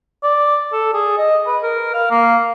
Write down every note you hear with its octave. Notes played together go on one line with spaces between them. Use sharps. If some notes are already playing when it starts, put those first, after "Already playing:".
D5
A4
G#4
D#5
B4
A#4
F5
A#3